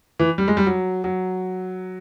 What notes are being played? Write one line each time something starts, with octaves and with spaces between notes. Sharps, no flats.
E3
G3
G#3
G3
F#3
F#3